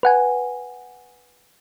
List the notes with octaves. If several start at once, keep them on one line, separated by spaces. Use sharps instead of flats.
B4 F#5 G#5